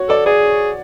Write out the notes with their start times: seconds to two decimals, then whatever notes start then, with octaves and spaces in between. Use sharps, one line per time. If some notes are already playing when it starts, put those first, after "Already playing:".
Already playing: F#4 C#5
0.09 A4 D5
0.26 G#4 D5